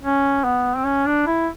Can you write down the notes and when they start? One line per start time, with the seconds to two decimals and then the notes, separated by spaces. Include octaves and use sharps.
0.02 C#4
0.44 B3
0.77 C4
0.85 C#4
1.06 D4
1.27 E4